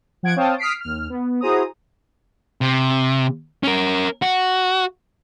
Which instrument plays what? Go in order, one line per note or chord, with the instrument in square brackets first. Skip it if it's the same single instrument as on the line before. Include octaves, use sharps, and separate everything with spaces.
[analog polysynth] F3 F#5 G#6 D7
C4 C#5 F5 G5 A5 D#6
D#6 F6 B6 C7 D7
D#2 F6
B3
E4 F#4 G#4 C5 A#5 D#6
[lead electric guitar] C3
C#4 A#4
F#4